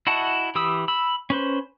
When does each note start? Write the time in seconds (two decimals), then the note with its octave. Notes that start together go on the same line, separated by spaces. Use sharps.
0.07 E4 F#4 D#5 F#5 A5
0.55 E3 G4 B5 D#6 E6
0.88 B5 E6
1.30 C#4 B4 C5